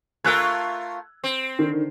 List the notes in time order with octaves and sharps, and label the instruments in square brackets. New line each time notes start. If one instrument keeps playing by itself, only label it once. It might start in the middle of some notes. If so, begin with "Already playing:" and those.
[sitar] A3 F4 A#4 [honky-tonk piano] E6 F#6 G#6
[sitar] C4
[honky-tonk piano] D3 D#3